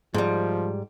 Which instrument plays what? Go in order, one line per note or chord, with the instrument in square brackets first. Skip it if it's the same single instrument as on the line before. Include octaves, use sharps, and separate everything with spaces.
[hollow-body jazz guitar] G#2 G3 [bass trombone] F3